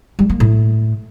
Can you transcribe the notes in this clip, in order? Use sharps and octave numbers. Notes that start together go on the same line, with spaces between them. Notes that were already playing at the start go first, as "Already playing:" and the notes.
G3
A#3
A2